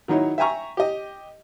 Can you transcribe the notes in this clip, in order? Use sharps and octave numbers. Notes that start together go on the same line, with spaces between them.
D#3 F#3 D#4 E4 C#5
E5 G5 G#5 A#5 C#6
G4 D#5